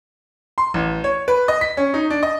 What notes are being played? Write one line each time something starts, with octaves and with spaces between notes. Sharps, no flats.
C6
A1
C#5
B4
D#5
B6
C#4
D#4
D4
D#5